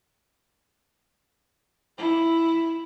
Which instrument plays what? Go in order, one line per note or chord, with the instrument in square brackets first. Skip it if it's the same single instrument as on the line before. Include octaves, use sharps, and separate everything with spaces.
[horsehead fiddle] E4